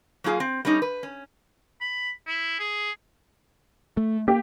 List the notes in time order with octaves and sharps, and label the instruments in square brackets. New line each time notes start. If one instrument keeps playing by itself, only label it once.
[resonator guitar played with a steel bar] F#3 A#3 F4 G#4
C4
G3 A3 C#4 D#4
B4
C#4
[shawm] B5
E4
G#4
[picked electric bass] A3
[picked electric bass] A#3 [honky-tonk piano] G4